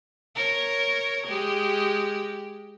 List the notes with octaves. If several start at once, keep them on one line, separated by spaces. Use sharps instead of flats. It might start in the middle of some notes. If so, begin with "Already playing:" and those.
A#4 C#5
G#3 G4